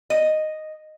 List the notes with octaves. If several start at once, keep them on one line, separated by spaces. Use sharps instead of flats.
D#5